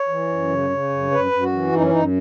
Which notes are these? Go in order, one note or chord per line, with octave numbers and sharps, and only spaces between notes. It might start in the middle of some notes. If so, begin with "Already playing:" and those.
Already playing: C#5
E3
F#2
C#3
C#3
F#2
F#2 B4
F#2
F#4
E3
F#2 D#4
C#4
F#2 D#4